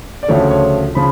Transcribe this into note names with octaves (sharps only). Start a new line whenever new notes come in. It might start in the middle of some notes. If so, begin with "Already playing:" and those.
D5
D2 C#3 F3 A3 C#5
C#5
C#3 F3 B5